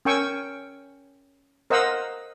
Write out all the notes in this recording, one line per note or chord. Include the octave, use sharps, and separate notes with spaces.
C#4 A#4 G5 G#5 C#6 E6
A#4 C5 D#5 F5 F#5 E6